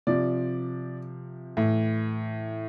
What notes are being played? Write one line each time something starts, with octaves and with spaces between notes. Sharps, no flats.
C3 F3 D5
A2 E3